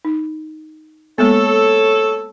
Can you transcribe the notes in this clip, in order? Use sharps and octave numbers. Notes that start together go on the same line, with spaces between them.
D#4
G#3 A#3 B3 A4 C#5